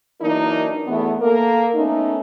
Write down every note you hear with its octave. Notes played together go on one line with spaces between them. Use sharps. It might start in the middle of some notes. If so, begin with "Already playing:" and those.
E3 F#3 A#3 D4 D#4 A#4
E2 A3 B3
A#3 A4 A#4
A3 B3 C#4 D#4